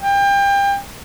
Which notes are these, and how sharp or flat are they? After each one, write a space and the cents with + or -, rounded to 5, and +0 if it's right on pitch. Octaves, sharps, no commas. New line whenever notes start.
G5 +30